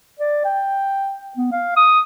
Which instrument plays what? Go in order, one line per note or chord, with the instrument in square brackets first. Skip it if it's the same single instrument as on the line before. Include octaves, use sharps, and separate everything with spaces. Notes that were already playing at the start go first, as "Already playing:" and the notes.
[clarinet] D5
G5
B3
F5
D#6